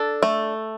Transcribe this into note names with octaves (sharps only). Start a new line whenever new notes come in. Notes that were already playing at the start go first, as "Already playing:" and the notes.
Already playing: D4 A4
A3